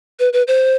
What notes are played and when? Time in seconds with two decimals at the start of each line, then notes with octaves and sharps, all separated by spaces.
0.20 B4
0.33 B4
0.47 C5